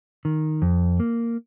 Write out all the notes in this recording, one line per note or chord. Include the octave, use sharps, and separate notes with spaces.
D#3
F2
A#3